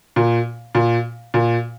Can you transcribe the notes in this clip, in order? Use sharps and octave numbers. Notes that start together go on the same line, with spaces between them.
A#2
A#2
A#2